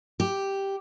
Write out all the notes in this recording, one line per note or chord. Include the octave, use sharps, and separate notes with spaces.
G4